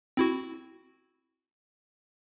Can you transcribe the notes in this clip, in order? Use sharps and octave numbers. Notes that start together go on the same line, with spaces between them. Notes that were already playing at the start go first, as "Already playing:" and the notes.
C4 E4 F#4